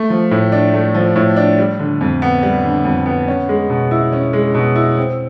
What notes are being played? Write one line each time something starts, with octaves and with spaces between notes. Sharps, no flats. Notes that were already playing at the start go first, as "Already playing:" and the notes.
Already playing: A3
F3
A2
D4
A3
F3
A2
D4
G3
D3
F2
B3
G3
D3
F2
B3
C#4
G#3
B2
E4
C#4
G#3
B2
E4
C4